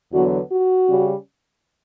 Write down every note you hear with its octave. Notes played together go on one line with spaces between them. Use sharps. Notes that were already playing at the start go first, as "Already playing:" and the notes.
E2 D3 F#3 B3 F#4
F#4
C#3 G3 C#4